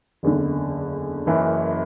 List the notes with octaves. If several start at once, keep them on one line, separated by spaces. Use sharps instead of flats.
F#1 E2 D3
F#1 F#2 E3